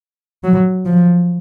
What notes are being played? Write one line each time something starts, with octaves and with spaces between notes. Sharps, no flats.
F#3
F3